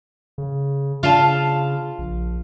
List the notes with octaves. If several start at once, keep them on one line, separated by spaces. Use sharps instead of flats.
C#3
C#3 F4 F5 A5
A#1